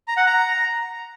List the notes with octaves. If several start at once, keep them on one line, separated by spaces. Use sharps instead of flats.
A#5
F#5
A#5